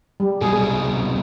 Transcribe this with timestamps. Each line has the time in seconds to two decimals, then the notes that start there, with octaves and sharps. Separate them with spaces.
0.20 G3
0.41 C2 B2 G#4